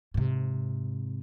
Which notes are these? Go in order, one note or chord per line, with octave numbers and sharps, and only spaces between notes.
G#2 C3